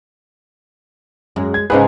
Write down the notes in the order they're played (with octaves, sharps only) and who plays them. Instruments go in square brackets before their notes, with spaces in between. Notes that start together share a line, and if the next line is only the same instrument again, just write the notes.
[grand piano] F#2 [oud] G#3
[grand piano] G#6
[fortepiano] C#2 G#3 G#4 [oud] G#2 C4 D#4 [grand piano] B4